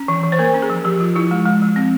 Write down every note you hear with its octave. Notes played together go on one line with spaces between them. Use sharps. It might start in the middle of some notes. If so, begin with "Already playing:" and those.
Already playing: C#4
E3
E3
C5
A#3 A#4
C#4
G#4
F3
F3 G4
F3 F4
F3 E4
G#3
G#3
F3
C4